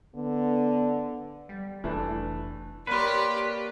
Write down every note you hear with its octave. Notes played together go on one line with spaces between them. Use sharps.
D3 B3
G3
F1 E3 A3 D4
A#3 G4 B4 C#5 D5 C6